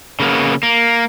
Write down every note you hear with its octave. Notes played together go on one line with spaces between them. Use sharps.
C#3 A#3 B3
A#3